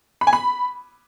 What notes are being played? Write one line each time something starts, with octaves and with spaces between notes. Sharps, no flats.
B5
G#5
B5